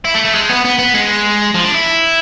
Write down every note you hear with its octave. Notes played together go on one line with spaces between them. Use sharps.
E4
A3
A3
G#3
B3
B3
B3
G#3
F3
D4
E4